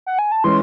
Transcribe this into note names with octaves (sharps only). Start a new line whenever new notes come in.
F#5
G#5
A5
E3 G#3 C#4 C6